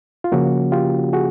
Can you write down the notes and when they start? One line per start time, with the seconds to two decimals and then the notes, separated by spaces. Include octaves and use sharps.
0.24 F4
0.32 C#3 F3 A#3 C#4 F#4
0.72 F4 G4
1.13 F#4 G#4